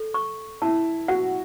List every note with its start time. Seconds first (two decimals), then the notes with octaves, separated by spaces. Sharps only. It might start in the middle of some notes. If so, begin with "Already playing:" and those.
Already playing: A4
0.14 C#6
0.62 E4 A5
1.08 F#4 F#5